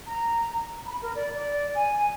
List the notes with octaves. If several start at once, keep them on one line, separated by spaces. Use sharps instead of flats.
A#5
B5
A#4
D5
D5
G#5